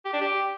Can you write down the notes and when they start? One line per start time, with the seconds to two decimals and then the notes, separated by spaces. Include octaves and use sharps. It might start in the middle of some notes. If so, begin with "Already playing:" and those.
0.05 G4
0.13 D4
0.21 G4